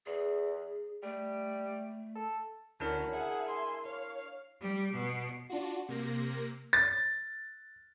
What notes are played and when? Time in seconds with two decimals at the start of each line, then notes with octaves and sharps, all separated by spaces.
0.06 E2 G#4
1.03 G3 A3
2.15 A4
2.80 D2 C#4 D4 E4 F#4 A#4 C#5
3.13 G#4 E5 F#5 G#5
3.47 C6
3.85 C#5 F5
4.60 G3
4.93 B2
5.50 D4 F4 F#4
5.88 C3 A#3 A#6
6.73 A6